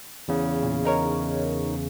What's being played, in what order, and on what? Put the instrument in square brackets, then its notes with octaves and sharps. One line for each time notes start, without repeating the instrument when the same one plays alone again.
[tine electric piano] E2 C#3
[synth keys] A#2
D#4 A#4 C#5